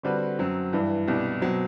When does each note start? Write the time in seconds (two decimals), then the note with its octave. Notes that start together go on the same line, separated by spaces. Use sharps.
0.03 D3 G3 C4 F#4 B4
0.39 F#2 F#3 C4
0.73 G2 E3 G3
1.07 C2 B2 G3 D4
1.42 B2 F#3 C4